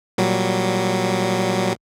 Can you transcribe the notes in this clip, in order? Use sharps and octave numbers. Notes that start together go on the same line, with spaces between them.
A#2 F#3 G3